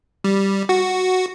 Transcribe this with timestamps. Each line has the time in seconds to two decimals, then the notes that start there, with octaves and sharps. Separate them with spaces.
0.24 G3
0.69 F#4